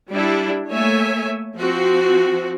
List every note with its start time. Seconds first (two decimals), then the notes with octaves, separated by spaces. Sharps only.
0.11 G3 D4 E4
0.72 A3 A#3 C#5 E5 G#5
1.56 F3 C4 F#4